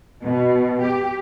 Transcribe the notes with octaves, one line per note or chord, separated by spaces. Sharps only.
B2
G4